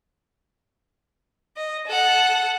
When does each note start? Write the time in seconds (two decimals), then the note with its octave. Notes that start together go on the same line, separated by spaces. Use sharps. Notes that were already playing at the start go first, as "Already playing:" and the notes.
1.57 D#5
1.87 A4 F#5